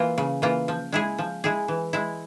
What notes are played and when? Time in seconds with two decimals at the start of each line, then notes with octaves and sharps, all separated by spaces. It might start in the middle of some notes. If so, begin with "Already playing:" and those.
Already playing: E3 A#3 F4
0.18 C#3
0.42 E3 A#3 F4
0.68 F3
0.92 G#3 E4 G#4
1.18 F3
1.44 G#3 E4 G#4
1.68 E3
1.93 G#3 E4